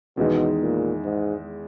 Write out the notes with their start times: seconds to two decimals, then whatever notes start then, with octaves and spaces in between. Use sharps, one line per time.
0.17 E2 B2 D#3 G#3 D#4
0.62 A#2
1.04 G#2